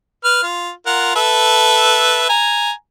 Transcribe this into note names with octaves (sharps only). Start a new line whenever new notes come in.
B4 F6
F4
F4 A#4 F#5
A4 B4 E5
G#5 A#5